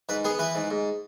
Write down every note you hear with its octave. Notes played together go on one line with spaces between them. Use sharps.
G#2 B4
B3 G#4
E3 B4
G#2
G#2